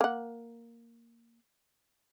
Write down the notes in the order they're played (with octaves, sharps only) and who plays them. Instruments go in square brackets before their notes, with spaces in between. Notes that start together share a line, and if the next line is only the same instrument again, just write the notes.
[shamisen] A#3 F#5